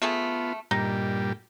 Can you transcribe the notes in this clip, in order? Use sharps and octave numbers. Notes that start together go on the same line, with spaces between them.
A3 B3 F4 G#4 A4
G2 A#2 G3 D#4